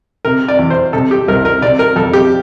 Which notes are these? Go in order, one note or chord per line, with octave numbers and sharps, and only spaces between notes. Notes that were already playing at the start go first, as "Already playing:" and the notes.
C3 A#4
D5
E2
C5
C3 A4
G4
C2 A#4
A#4
C3 D5
A#4
F2 A4
G4